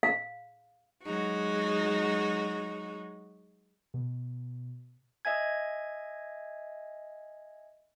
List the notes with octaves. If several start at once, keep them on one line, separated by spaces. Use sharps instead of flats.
F5
F#3 G#3 D#4 F#4
B2
D#5 E5 G#5 G#6